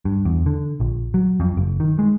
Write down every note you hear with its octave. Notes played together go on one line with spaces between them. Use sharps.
G2
E2
D3
A#1
F#3
F2
F#1
D#3
G#3